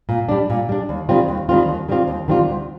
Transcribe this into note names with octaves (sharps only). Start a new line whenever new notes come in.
A#2
G3 D4
A#2
G3 D4
D#2
D#3 G3 C4 F4
D#2
D#3 G3 C4 F4
D#2
D#3 G3 C4 F4
D#2
D#3 G3 C4 F4
D2